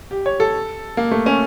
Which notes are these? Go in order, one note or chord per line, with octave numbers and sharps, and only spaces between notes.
G4
C#5
A4
A#3
A3
C#4